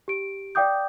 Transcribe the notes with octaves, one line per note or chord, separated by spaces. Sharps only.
G4 D7
D5 F5 G5 D6 D#6 G6